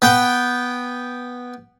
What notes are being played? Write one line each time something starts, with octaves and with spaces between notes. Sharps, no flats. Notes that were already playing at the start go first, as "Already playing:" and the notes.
B3 G5